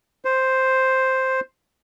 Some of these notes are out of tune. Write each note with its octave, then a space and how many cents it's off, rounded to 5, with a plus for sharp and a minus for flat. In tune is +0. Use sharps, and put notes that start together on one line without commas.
C5 +0